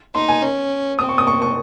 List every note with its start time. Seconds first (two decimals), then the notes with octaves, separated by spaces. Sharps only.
0.14 D#4 C6
0.28 G#5
0.42 C#4
0.99 C4 D#6
1.09 C#6
1.18 D#6
1.27 C#6
1.42 C#6